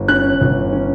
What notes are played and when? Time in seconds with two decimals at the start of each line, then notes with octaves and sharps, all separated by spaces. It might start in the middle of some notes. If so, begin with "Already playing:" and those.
Already playing: G1
0.08 C#4 F#6
0.41 G1
0.73 C#4